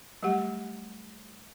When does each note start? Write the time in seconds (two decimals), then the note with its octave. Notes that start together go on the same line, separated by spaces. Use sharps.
0.23 F#3 G3 A3 G4 F#5